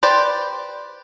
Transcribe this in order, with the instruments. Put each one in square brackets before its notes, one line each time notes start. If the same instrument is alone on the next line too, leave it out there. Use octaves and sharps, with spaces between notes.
[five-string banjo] G4 B4 C5 D5